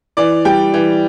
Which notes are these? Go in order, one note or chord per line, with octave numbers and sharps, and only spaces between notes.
E3 D5
G3 G5
E3